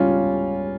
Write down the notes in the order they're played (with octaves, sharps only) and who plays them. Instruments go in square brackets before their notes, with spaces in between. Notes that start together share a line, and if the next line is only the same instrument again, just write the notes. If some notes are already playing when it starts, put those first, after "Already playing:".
Already playing: [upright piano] C#2 G3 C#4 F4